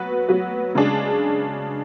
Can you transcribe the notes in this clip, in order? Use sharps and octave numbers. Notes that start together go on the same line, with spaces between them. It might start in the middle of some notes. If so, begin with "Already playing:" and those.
Already playing: F#3 B3 F#4 B4
F#3 B3 F#4 B4
C#3 G#3 D4 G#4